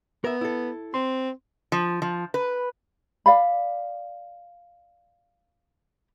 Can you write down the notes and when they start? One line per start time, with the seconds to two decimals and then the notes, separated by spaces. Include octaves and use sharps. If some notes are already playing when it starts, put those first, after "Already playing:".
0.24 B3 A#4 E5
0.41 E4 A4
0.94 C4 C6
1.72 F3
2.02 F3
2.34 B4
3.26 D5 F5 B5